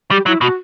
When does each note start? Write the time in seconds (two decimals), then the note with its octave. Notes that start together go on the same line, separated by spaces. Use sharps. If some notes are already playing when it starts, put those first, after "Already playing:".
0.11 G3 G4
0.26 F#3 E4
0.41 B2 F#4